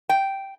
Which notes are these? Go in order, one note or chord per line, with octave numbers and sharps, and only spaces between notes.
G5